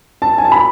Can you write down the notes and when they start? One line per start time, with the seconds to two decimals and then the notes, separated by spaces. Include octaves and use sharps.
0.22 A5
0.38 G#5
0.45 A5
0.52 B5